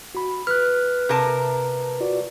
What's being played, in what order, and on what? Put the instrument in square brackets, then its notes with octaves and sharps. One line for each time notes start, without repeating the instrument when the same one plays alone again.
[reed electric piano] F#4 B5
[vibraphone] B4 [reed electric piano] F6 F#6
[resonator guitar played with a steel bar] C3 A#4 A5
[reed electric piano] F4 F#4 D5